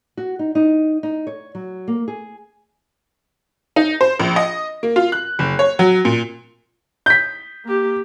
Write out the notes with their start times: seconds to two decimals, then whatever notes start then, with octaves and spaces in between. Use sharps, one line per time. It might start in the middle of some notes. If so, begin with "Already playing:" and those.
0.17 F#4
0.39 D#4
0.55 D#4
1.03 D#4
1.27 C#5
1.55 F#3
1.88 A#3
2.08 G#4
3.76 D#4
4.01 C5
4.20 A#1
4.36 D#5
4.83 A#3
4.96 F4
5.12 F#6
5.39 F#1
5.59 C#5
5.79 F#3
6.05 A#2
7.06 G6 B6
7.65 A#3 G4